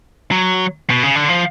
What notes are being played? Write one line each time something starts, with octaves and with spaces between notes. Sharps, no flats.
F#3
B2
C#3
D3
F3